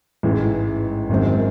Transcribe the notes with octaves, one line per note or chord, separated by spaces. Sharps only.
A1 G#2 E3 G#3
G#1 F#2 D#3 G#3 C4